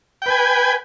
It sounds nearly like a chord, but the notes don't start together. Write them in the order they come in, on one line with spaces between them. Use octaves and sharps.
G5 B4 G#5